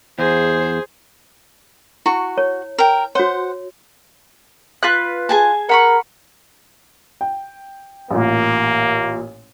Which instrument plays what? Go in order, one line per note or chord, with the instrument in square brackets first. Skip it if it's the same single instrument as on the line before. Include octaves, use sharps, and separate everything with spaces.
[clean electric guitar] E2 [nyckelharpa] G#4 [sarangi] C5
[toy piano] E4 [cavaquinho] F#4 C#6
[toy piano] C#5
[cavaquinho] A#4 G5
[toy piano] F#4 C#5 [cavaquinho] C5 F#5
[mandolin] F4 B4 F#6
[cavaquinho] G#4 G#5 A5
[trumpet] A#4 [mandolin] F#5 B5 C#6
[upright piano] G5
[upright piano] A1 A#2 [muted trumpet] A#3